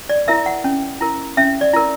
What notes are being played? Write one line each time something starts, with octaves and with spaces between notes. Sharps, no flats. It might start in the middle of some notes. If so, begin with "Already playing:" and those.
D5
E4 A#4 E5
F#5
C#4
E4 A#4
C#4 E5
D5
E4 A#4